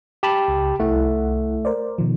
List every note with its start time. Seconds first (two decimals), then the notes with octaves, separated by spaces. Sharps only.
0.23 G4 A5 B5
0.48 C#2
0.80 C2 A3 E4 F#5
1.65 A#4 C5 D5
1.98 B2 D#3 F3